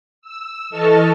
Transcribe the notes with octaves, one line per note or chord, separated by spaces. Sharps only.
E6
E3 A4 D#5 A5 C#6 F6